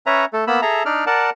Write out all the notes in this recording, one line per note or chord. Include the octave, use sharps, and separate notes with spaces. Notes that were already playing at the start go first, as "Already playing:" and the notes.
C#4 B4 C#5 E5 A#5
A3 A4
A#3 B3 B5 E6
G#4 A4 E5 A#5
D4 D#4 D5 F6
A#4 D5 F#5 A5